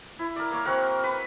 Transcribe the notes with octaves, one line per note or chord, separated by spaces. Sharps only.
E4
A#4 D5
A#3 C#5
C4 F#4 A#4 F#5
B4